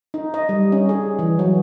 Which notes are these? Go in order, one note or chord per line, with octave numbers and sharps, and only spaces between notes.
D#4
D#5
G3
C#4
G#4
E3
F#3